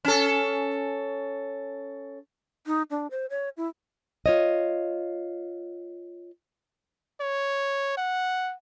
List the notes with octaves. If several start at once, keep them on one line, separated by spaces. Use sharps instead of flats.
C#4 A4
D#4
D4
C5
C#5
E4
F4 C#5 D#5
C#5
F#5